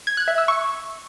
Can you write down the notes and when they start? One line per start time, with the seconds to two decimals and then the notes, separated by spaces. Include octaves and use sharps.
0.07 G#6
0.17 F#6
0.28 E5
0.38 E6
0.48 C#6